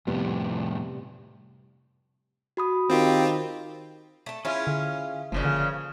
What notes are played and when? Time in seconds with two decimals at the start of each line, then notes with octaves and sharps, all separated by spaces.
0.07 F2 A2 C3 G3 B3
2.57 F#4 B5 D#6
2.90 D#3 C4 F4 G4
4.26 A3 A5
4.45 C#4 E4 F4 G#4 E5
4.67 D3
5.32 F#1 A#2 C#3 F3
5.45 D3